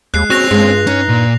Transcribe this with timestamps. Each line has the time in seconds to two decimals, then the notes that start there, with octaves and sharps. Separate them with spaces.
0.14 D#2 G#3 F#6 C7
0.30 C4 C#4 F#4 F#6 A#6 F7
0.51 G2 G#3 F4
0.87 C#4 D#4
1.09 A#2